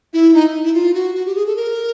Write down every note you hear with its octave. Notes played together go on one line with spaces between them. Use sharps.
E4
D#4
E4
F4
F#4
F#4
G4
G#4
A4
A#4